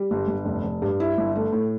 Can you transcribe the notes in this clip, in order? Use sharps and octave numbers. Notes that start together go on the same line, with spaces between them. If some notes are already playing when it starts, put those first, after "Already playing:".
Already playing: G3
G1
G1
F1
F1
G2
E4
G1
A3
A2